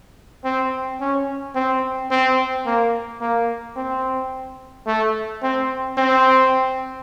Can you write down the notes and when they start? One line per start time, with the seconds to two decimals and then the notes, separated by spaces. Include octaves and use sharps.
0.44 C4
1.01 C#4
1.55 C4
2.11 C4
2.66 A#3
3.21 A#3
3.76 C4
4.86 A3
5.42 C4
5.97 C4